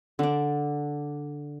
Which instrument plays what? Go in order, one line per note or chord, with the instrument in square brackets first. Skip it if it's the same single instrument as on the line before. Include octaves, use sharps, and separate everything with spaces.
[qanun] D3 D4